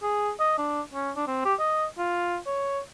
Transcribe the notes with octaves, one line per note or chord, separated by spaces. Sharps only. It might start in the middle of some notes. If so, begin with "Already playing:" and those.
G#4
D#5
D4
C#4
D4
C4
G4
D#5
F4
C#5